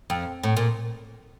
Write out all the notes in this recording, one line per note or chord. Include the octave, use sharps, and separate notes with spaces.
F2
A2
A#2